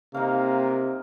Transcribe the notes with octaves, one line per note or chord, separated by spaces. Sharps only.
C3 A#3 D#4 F5